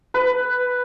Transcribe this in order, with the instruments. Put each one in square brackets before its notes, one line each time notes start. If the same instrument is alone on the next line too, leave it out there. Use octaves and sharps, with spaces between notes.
[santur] B4